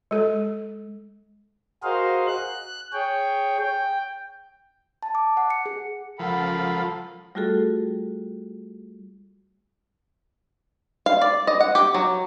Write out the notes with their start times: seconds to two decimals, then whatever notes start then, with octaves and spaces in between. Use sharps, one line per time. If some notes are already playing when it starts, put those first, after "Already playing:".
0.11 G#3 A4
1.83 F#4 G#4 A#4 C5 D#5 F5
2.27 F#6
2.93 G#4 C#5 G5
3.59 G5
5.03 A5
5.15 D6
5.37 F#5
5.50 C#7
5.66 G#4
6.19 C#2 F3 A4 A#4 F#5 B5
7.35 G3 A3 F4 F#4 G#4 A4
11.06 F5
11.21 D5
11.47 D#5
11.60 F#5
11.75 G4
11.95 F#3